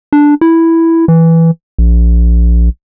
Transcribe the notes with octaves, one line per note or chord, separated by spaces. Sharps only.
D4
E4
E3
A#1